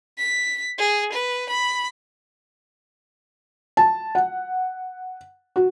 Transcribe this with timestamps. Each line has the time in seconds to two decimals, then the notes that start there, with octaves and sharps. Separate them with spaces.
0.18 B6
0.79 G#4
1.12 B4
1.49 B5
3.77 A5
4.15 F#5
5.56 F#4